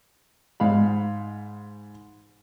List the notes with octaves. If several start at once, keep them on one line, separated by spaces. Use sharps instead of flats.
G#2 F5 B5